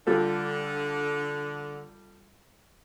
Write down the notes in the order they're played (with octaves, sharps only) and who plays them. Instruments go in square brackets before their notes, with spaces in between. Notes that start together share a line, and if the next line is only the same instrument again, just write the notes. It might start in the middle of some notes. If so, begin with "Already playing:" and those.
[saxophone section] D3 [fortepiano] G3 F4 A4